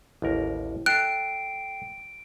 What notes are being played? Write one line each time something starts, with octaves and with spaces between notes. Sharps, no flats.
A1 D#2 E4 A#4
A4 D#5 G5 F#6 C7 D7